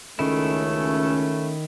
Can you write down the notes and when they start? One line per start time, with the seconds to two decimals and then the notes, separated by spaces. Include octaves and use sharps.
0.19 C#2 D#3 A3 C#4 E4